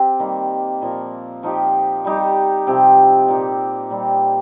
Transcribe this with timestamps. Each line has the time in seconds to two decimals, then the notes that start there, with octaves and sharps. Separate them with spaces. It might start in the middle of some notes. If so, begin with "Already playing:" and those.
Already playing: C4 G4
0.19 D#3 G3 A#3
0.82 A#2 F3 A#3
1.43 F3 D#4 G4
2.05 G3 D#4 G4
2.67 C3 F3 C4 G4
3.28 A#2 A#3 D#4 G4
3.90 A#2 G3 C4